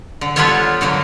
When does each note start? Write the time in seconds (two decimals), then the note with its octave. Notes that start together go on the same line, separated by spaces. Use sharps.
0.21 D3
0.36 G3 B3 D4 F4 A4 C#5
0.81 D3 F#3 A#3